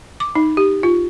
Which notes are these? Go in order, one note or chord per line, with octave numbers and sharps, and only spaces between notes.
D6
D#4
G4
F4